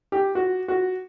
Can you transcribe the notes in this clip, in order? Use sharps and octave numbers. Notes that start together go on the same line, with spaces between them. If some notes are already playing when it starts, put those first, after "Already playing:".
G4
F#4
F#4